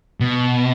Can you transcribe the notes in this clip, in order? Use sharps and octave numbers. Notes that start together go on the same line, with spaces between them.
B2